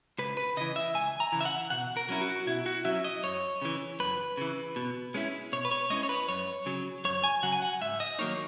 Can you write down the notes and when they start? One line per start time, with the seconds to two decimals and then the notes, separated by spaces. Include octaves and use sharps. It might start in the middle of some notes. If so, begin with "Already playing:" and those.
0.18 C#2 B4
0.37 B4
0.57 C#3 E3 D#5
0.76 E5
0.94 C#2 G#5
1.20 A#5
1.32 C#3 E3
1.41 E5
1.45 F#5
1.70 B2 F#5
1.97 A#4
2.09 F#3 C#4 E4
2.21 F#4
2.47 B2 E4
2.66 F#4
2.85 F#3 C#4 E4 E5
3.04 D#5
3.23 F#2 C#5
3.62 C#3 E3
4.00 F#2 B4
4.37 C#3 E3
4.76 B2
5.14 G#3 C#4 E4
5.52 B2 C#5
5.65 B4
5.71 C#5
5.90 G#3 C#4 E4 D#5
6.03 C#5
6.09 B4
6.29 F#2 C#5
6.66 C#3 F#3
7.05 F#2 C#5
7.24 G#5
7.42 C#3 F#3 F#5
7.52 G#5
7.62 F#5
7.81 G#2 E5
8.00 D#5
8.19 D#3 F#3 A#3 D#4 C#5